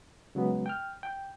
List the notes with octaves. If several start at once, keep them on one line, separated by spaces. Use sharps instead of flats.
C#3 F#3 G#3 B3
G5 F6
G5